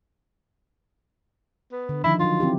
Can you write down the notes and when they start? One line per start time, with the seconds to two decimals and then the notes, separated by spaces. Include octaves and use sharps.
1.72 B3
1.89 D3
2.04 D#3 F3 D#4 E4
2.20 F3 F#3 F4
2.40 C4 E4 G4